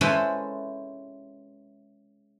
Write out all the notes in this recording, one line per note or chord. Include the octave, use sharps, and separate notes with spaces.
G#3 C#4 E4 A4 B4 C5